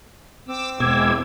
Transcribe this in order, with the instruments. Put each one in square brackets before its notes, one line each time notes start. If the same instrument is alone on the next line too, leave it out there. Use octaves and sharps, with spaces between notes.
[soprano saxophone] C4 [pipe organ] D6 E6
[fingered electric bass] E2 B2 [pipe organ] E3 G#3 [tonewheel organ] D6 E6 G#6